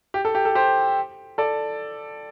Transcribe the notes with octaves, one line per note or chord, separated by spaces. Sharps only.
G4
A4
G4
A4
G4 C5
A4 D5